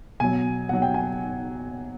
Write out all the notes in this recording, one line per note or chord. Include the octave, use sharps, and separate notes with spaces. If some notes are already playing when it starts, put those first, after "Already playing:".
B2 F#3 G#5
B2 F#3 F#5
G5
G#5